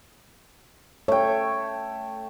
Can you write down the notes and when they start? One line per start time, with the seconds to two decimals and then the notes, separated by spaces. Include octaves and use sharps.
1.08 A3 C#5 G5